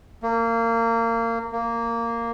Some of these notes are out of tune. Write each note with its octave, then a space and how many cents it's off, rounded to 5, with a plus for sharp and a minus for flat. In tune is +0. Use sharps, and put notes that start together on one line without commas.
A#3 -25
A#3 -10